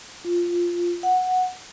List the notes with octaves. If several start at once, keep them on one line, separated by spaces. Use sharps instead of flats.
F4
F#5